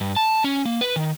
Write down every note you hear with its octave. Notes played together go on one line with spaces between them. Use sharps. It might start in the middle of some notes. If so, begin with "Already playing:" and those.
G2
A5
C#4
A#3
B4
D#3